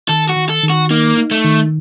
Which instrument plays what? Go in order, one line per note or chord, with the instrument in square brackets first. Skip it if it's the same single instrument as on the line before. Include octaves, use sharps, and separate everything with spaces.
[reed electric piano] D#3 [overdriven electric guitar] A4
[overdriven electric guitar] F#4
[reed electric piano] D#3
[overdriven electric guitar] A4
[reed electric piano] D#3
[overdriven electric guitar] F#4
[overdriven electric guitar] A#3 [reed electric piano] D#4
[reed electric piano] D#4
[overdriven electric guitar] A3
[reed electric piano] D#3